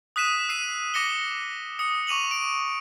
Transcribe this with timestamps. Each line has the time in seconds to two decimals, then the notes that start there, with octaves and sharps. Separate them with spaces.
0.16 D#6 F#6 B6 D#7 E7
0.49 E6 C7 D#7
0.94 D6 A#6 C#7 G7
1.79 D#6 C#7
2.07 C#6 D6 D#7 F7 F#7
2.31 D7